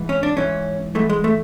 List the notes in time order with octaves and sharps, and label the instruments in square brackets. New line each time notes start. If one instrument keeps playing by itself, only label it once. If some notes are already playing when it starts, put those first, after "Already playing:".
Already playing: [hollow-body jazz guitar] G#2 E3
C#4
D4
G#2 E3 C#4
G#2 E3 A3
G#3
A3